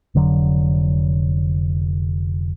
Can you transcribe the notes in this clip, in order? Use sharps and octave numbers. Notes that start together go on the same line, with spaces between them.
F1 D3 F#3